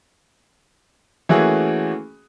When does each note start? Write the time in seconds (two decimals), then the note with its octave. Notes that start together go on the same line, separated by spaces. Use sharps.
1.29 E3 A3 A#3 C#4 F#4 G#4